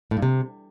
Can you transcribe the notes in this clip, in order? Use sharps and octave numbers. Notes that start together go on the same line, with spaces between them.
A2
G2
C3